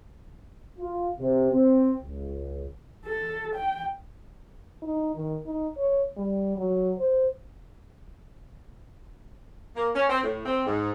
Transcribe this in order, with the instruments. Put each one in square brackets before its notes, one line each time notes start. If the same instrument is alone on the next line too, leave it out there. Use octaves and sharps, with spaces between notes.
[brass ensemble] F4
C3
C4
C#2
[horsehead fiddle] A4
G5
[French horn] D#4
D#3
D#4
C#5
G3
F#3
C5
[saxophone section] A#3
C#4
C4
A2
C4
G#2